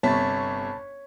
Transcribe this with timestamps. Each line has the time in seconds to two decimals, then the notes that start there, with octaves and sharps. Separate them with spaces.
0.03 G1 C3 C#5 A5 B5 A6 B6